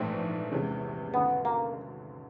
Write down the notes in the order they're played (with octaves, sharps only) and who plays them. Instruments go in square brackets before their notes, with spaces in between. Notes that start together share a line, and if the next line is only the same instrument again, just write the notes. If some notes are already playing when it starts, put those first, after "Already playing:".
Already playing: [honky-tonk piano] A#1 G#2 E3 A3 D4 [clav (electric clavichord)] C4
[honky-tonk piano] E2 C3 E3 G#3 C#4
[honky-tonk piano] G#1 F#2 D3 [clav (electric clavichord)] B3
[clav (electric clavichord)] A#3